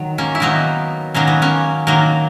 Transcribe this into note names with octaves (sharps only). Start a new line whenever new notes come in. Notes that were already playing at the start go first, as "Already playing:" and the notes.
Already playing: D#3 F#3
A#3 C#4
E4
D#3 F#3 A#3 B3 D#4
D#3 F#3 A#3 C#4
B3
A#3 C#4
D#3 F#3 A#3